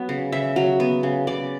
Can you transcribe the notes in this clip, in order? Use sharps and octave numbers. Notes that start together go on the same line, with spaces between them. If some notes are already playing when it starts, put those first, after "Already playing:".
Already playing: F#3 B3
C#3
C#3 E5
F#3
B3
C#3
C#3 D5